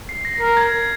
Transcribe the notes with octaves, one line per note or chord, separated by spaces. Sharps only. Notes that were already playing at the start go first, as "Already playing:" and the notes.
C7
A#6
A#4 C7
G#6